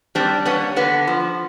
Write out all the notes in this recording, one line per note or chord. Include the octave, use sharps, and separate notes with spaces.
G3 C4 D4
A#3 B3 C#4
D3 B3
F3